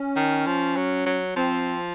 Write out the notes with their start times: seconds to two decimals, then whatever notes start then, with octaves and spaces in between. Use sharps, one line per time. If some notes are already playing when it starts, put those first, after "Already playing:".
Already playing: C#4
0.16 D#3
0.47 F3
0.77 F#3
1.06 F#3
1.36 F3 C4